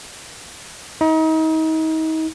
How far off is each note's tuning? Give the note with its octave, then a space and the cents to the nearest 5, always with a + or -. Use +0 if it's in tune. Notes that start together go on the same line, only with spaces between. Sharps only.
D#4 +35